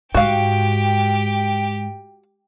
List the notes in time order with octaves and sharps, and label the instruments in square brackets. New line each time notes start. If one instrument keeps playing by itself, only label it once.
[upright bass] G#2 [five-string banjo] F#4 F5 [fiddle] G4 G5